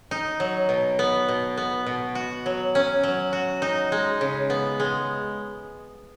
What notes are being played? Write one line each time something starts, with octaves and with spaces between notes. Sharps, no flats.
D#4
F#3
B2
B3
B2
B3
B2
F#4
F#3
C#4
F#3
F#4
D#4
G#3
C#3
B3
G#3